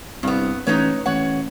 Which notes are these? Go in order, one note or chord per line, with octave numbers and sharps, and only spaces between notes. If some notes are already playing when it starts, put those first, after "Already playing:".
C2 G2 B3
A1 D#4 B4 C#5
A1 C#5 F#5